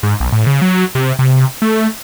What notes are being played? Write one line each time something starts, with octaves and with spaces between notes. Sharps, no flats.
G#2
B1
A2
C#3
F#3
C3
C3
A3